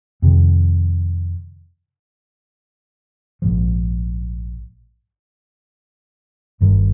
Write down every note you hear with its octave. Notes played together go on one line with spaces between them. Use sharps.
F2 C3 D#3
A#1 G#2 F3
G1 G2 D#3